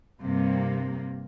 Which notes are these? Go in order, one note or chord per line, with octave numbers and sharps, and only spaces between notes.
G2 C3 A#3